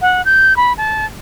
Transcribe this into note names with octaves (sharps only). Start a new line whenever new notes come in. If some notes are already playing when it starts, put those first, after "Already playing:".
F#5
G6
B5
A5